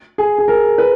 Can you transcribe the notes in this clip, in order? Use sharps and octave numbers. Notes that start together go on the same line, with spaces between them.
G#4
G#4
A#4
B4